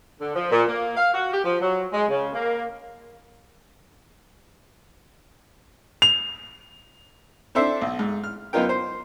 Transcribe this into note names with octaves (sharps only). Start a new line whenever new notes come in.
D3
F3
A#2
A#3
F5
F#4
G4
F3
F#3
G#3
C#3
A#3
F7
C4 D4 A4 C5 E5
B1
G#2
F6
F#2 B3 D#4 F4 A#4 G5
C5